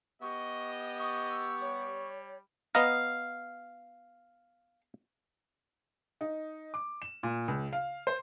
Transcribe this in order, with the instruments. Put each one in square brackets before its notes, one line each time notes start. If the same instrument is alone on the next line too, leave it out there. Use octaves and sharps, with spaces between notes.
[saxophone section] B3 G4 [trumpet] D#5 [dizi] C#6
[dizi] C#6 [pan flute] D#6
[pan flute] E6
[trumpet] G3 [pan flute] C#5
[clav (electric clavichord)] B3 D#5 A#5 [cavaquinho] F5
[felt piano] D#4
D6
E7
A#2
C#2
F5
C5